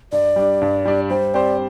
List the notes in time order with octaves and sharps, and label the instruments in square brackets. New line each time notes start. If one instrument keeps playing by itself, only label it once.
[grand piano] G2 [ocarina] D5
[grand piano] G3 D4
G2
G3 D4
[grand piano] G3 [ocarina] C5
[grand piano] C4 G4 C5 [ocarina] D5